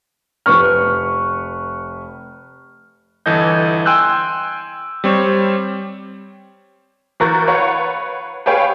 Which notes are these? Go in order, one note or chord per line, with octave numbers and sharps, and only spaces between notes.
F1 B4 C#6 F6
G1 E3 A4 D#5 G6
G5 G#5 C6 E6 F#6 G6
G3 C4 C#5
E3 F#4 A#4 C#6 G6 A6
B4 C#5 F5 F#5
G4 G#4 B4 C#5 F5 G5